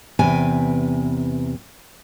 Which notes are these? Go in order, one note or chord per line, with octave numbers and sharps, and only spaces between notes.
E2 C3 B4 G5 G#5